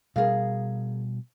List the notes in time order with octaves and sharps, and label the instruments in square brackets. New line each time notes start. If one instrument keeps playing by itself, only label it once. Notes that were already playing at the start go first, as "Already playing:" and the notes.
[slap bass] B2 G3 [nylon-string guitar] G#4 A#4 F5